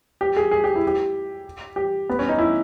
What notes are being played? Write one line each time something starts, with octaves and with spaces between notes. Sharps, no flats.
G4
G#4
G#4
G4
E4
G4
G4
B3
C#4
D#4
E4